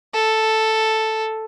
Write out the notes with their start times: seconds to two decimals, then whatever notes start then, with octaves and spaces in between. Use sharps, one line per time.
0.14 A4